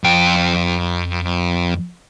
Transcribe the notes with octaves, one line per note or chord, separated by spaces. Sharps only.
F2 G5